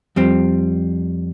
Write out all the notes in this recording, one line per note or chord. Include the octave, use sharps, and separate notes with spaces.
F2 G3 C4